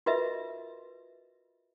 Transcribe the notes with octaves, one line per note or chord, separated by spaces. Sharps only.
F4 F#4 A#4 B4 D#5 E5